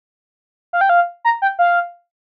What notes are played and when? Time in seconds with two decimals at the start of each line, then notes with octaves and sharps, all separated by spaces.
0.73 F5
0.81 G5
0.89 F5
1.25 A#5
1.42 G5
1.59 F5